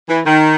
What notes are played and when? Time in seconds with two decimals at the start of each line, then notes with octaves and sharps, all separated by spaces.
0.09 E3
0.25 D#3